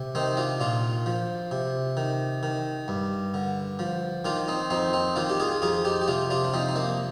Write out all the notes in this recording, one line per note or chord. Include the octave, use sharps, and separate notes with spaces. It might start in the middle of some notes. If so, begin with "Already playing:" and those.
Already playing: C3
D#3 C4 D#4
D4 F4
A#2 D4 F4
F3
C3
D#3
D#3
G2
D3
F3
D#3 D4 F4
C4 D#4
F2 C4 D#4
C4 D#4
D#3 D4 F4
G4
F4 G#4
F2 F4 G#4
D#4 G4
G4
C3 D4 F4
D4 F4
D4
F3 C4 D#4
D#4
A#3 D4